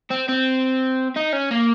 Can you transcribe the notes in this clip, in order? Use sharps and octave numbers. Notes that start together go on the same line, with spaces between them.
C4
C4
D#4
C#4
A#3